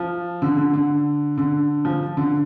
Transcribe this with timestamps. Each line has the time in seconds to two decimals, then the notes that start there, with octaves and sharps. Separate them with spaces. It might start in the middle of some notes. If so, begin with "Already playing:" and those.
Already playing: F3
0.42 D3
0.57 D3
0.73 D3
1.38 D3
1.85 F3
2.17 D3